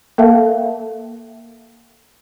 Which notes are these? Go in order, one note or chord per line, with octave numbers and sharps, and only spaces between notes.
A#3 A4 A#4 E5 F5 A5